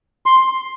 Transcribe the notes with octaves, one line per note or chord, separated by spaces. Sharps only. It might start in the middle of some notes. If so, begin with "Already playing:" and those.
C6